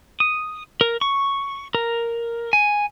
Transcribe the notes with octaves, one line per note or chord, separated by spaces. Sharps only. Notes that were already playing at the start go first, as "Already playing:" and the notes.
D#6
A#4
C#6
A#4
G#5